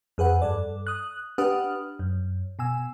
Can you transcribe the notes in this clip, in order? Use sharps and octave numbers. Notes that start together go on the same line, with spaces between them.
F2 G#4 B4 F#5
G2 A4 D5
D#6 F#6
D4 G4 B4 F#5 D#6 F6
F#2
B2 G#5 E6